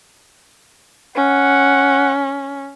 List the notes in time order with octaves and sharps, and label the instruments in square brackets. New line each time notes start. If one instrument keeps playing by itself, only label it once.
[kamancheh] C#4 [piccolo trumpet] F#5